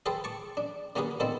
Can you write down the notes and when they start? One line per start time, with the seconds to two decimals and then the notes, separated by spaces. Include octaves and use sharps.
0.06 G#4 A4 B4 C5 G5 A5
0.24 A5 C#6 D6
0.57 D4
0.96 C#3 A#3 C#4 F#4 G#4 B4
1.20 A#2 D#3 B3 C4 A4